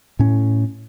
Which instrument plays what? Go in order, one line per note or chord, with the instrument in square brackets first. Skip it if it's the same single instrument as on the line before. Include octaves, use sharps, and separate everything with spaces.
[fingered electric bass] A2 C#4